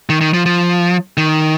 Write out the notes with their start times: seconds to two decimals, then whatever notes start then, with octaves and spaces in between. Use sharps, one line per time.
0.10 D#3
0.21 D#3
0.34 F3
0.46 F3
1.17 D#3